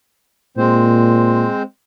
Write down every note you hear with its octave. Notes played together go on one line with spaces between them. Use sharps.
A#2 G#3 C4 C5